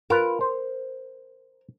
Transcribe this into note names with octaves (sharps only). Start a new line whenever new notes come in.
F4 A#4 B4
C5